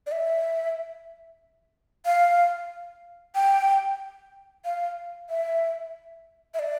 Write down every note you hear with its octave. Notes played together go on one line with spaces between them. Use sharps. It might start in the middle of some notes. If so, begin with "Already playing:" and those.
D5
E5
F5
G5
F5
E5
E5
D5